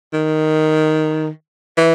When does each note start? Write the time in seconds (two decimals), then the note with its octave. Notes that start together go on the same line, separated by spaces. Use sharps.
0.13 D#3
1.78 E3